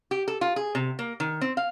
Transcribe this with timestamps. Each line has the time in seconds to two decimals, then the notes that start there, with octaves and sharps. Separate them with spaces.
0.11 G4
0.28 A4
0.41 F4
0.56 G#4
0.75 C3
0.99 A#3
1.20 D#3
1.41 C4
1.57 F5